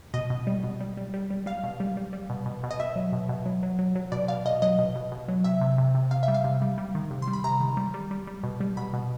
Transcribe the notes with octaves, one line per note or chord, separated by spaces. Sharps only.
B2 D#5
B2
G3
B2
G3
G3
G3
G3
G3 F5
B2
G3
G3
G3
B2
B2
B2
D#5
B2 E5
F#3
B2
B2
F#3
F#3
F#3
F#3
B2 D5
B2 F5
B2 D#5
F#3 D#5
B2
B2
B2
F#3
C3 E5
C3
C3
C3
C3 F5
E5
G3
F5
C3
G3
G3
D#3
C3
C6
G3
B5
C3 A#5
D#3
G3
G3
G3
G3
B2
G3
B2 B5
B2